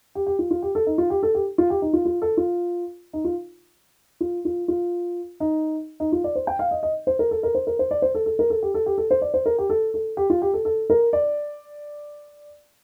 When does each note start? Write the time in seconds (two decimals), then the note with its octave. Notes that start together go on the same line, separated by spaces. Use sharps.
0.15 G4
0.27 G4
0.39 F4
0.51 F4
0.62 G4
0.75 A4
0.87 D#4
0.98 F4
1.10 G4
1.23 A4
1.35 G4
1.58 F4
1.70 G4
1.82 D#4
1.93 F4
2.05 F4
2.22 A4
2.37 F4
3.13 D#4
3.25 F4
4.21 F4
4.45 F4
4.68 F4
5.40 D#4
6.00 D#4
6.12 F4
6.24 D5
6.35 C5
6.47 G5
6.59 F5
6.71 D#5
6.83 D#5
7.07 C5
7.19 A#4
7.31 A4
7.43 A#4
7.55 C5
7.67 A#4
7.79 C5
7.91 D5
8.02 C5
8.15 A4
8.26 A4
8.39 A#4
8.50 A4
8.63 G4
8.74 A4
8.86 G4
8.98 A4
9.11 C5
9.22 D5
9.34 C5
9.46 A#4
9.58 G4
9.70 A4
9.94 A4
10.17 G4
10.30 F4
10.42 G4
10.53 A4
10.65 A4
10.90 A#4
11.13 D5